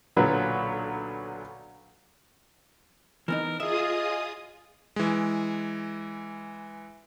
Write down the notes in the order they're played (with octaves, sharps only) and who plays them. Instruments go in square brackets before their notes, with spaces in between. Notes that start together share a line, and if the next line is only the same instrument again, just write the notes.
[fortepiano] B1 A#2 D3 F#3 B4 C#5
[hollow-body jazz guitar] E3 B3 D#4 [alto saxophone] A#4
[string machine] F4 G#4 D#6 [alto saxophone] D#5 [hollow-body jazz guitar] E5
[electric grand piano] E3 G#3